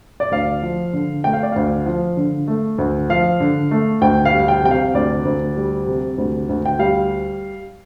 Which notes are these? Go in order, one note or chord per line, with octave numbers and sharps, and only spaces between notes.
D5
D2 F5
F3
D3
A3 G5
F5
D5
D2 F5
F3
D3
A3
D2
F3 F5
D3
A3
D2 G5
F5
G3
G5
C3 G5
F5
D2 D5
D2
G3
C3
D2
D2
G5
G3 F5